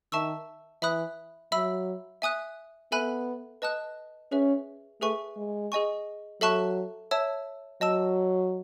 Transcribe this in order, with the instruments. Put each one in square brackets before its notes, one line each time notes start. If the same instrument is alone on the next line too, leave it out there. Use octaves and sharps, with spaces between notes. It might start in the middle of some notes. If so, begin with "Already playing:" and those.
[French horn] D#3 [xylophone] E5 A5 C#6 E6
[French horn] E3 [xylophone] E5 B5 D#6 F#6
[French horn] F#3 [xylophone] E5 B5 E6
[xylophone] E5 G#5 D#6 F#6
[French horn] B3 [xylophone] A4 E5 G#5 B5 F#6
[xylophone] B4 D#5 A5 D#6 F#6
[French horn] C#4 [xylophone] G#4 B4 E5
[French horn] A3 [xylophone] G#4 B4 E5 G#5 C#6
[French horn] G#3
[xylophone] G#4 D#5 G#5 C#6
[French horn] F#3 [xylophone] A4 E5 A5 C#6 F#6
[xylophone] C#5 E5 A5 E6
[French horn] F#3 [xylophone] D#5 A5 E6